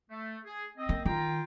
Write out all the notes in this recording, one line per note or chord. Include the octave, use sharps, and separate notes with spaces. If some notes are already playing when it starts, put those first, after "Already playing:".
A3
G#4
C4 D#5
A#3
D#3 F4 G5 A#5